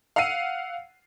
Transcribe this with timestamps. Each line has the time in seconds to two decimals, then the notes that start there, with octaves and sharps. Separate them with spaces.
0.16 F5 F#5 E6 C7 D#7